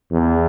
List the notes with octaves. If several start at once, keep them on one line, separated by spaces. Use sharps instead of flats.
E2